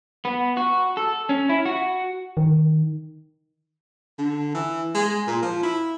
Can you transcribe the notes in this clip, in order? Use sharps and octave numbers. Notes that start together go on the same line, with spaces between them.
B3
F#4
A4
C#4
E4
F#4
D#3
D3
E3
G#3
A#2
F3
E4